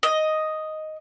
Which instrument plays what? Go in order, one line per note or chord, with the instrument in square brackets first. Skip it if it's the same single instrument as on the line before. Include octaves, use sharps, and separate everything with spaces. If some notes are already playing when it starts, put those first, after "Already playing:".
[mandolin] D#5